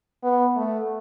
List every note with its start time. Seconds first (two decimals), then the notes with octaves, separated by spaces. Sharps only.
0.23 B3
0.56 A3